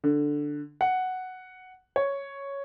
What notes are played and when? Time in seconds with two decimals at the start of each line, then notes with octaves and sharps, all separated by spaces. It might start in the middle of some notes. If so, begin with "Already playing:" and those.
0.04 D3
0.81 F#5
1.96 C#5